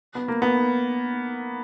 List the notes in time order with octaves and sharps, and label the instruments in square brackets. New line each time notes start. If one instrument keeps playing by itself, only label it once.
[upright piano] B3
A#3
B3